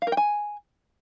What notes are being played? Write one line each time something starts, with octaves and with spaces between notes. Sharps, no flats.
F5
A#4
G5
G#5